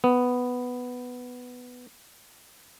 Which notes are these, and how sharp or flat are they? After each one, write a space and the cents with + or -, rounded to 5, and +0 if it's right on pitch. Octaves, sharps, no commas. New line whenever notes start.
B3 +5